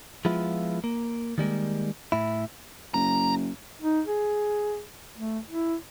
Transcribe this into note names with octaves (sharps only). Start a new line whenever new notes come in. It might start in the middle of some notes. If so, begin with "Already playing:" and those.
F3 G#3 B3 E4 F4
A#3
D#3 G3 G#3 A#3
A2 E4
F#1 A#5
D#4
G#4
A3
E4